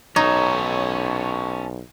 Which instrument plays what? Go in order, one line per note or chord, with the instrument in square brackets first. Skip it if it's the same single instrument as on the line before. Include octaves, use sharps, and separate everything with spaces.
[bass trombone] B1 [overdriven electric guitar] C#4 A4 [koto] D#4 [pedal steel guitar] C#5